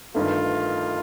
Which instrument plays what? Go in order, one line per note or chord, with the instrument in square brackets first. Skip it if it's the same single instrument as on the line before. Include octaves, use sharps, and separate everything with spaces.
[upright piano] G1 G2 D#3 A3 [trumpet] F4